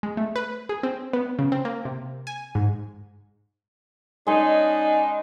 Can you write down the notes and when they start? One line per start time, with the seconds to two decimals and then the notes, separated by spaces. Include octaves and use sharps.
0.03 G#3
0.17 A3
0.36 B4
0.69 G#4
0.83 C4
1.13 B3
1.39 C#3
1.52 C4
1.65 A#3
1.85 C3
2.27 G#5
2.55 G#2
4.27 C#3 G#3 D4 D#4 C#5 G#5